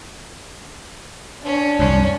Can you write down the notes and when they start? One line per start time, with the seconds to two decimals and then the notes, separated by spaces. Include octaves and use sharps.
1.45 C#4 D4
1.79 C2 F#2 C#4